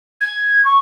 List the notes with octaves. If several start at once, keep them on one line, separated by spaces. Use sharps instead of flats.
G#6
C#6